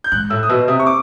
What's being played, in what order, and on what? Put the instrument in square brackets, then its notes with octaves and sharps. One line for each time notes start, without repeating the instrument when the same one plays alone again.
[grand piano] G6
[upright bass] G#2 [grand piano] F#6
[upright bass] A2 [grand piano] E6
[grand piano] D#6
[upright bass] B2 [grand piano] E6
[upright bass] C3 [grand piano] D#6
[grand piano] C#6
D6